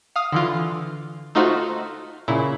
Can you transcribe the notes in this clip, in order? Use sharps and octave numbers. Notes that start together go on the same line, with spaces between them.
F5 D#6
D3 E3 F4
A3 D#4 F4 F#4 C5
A#2 C#3 E4